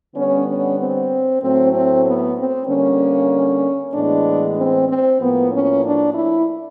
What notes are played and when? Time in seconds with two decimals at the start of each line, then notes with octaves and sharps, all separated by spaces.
0.15 D3 G3 B3 C#4
0.47 C#4
0.79 C4
1.42 A2 F#3 A3 C4
1.73 C4
2.05 B3
2.37 C4
2.68 D3 G3 A#3 C#4
3.94 A2 E3 G#3 B3 D4
4.57 C4
4.89 C4
5.20 A2 F3 A#3 B3
5.52 C#4
5.83 D4
6.14 E4